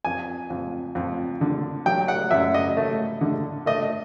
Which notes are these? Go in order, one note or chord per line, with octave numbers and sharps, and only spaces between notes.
F2 G#5
F2
F2
D3
F#3 G5
F#5
F#2 E5
D#5
A3
D3
A3 D#5